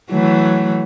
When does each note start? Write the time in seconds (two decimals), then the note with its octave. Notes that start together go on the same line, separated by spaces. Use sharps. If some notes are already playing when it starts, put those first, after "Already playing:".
0.11 E3 F#3 A3